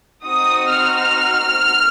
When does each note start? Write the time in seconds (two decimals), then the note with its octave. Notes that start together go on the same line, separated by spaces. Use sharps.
0.25 C4 D#4 F#4 D#6
0.70 F6